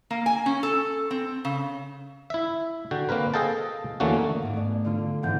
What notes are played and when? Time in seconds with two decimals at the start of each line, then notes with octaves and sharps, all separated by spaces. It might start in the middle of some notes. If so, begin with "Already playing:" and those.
0.11 A#3
0.26 G#5
0.46 C#4
0.63 A4
1.11 C4
1.45 C#3
2.30 E4 E5
2.91 D3 F#4 G5
3.09 A#3 C4 A#4 B4
3.34 G#4 A4 D#5 F5 G5 A5
4.00 E2 D3 A3 A#3 C#4 F#4
4.42 G#2 D4
4.54 A3 B3 D5
4.85 D3 D4 F4 D5
4.98 D3
5.23 F#1 G#2 E3 B3 F#5 G6